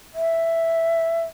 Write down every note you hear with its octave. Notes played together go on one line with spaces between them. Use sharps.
E5